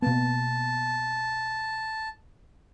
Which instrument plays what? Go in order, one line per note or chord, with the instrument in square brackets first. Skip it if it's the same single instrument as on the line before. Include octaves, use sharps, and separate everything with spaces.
[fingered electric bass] B2 A#3 B3 [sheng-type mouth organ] A5